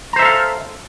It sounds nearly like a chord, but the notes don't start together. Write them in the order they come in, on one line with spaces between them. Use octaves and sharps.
A#5 C5 E5 A4 F5